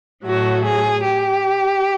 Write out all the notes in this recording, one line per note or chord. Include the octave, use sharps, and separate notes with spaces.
A2 F#3 A3 F#4
G#4
G4